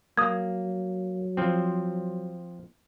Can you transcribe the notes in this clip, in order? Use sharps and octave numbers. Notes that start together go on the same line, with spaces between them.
F#3 A#3 D#6 G#6
F3 C4